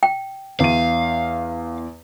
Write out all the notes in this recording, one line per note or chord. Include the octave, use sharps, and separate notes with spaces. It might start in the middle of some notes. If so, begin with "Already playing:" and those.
G5
E2 F5 D#7